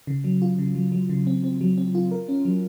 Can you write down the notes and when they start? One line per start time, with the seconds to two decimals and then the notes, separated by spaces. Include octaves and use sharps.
0.07 C#3
0.24 F#3
0.42 F4
0.58 C#3
0.75 F#3
0.92 F#3
1.09 C#3
1.27 C4
1.44 C4
1.61 F#3
1.78 C4
1.95 F4
2.11 A#4
2.29 C#4
2.45 F#3